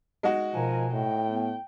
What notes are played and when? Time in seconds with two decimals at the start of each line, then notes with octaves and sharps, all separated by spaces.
0.23 G#3 D#4 F#4
0.54 B2 F3 A#4 G#5
0.93 A2 G5
1.26 B3